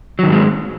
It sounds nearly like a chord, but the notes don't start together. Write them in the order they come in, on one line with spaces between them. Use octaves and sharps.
F#3 D#3 G#2 G#3